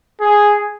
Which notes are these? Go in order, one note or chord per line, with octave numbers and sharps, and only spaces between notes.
G#4